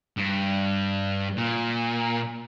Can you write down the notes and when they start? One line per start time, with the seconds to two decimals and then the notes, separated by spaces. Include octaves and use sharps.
0.17 G2
1.37 A#2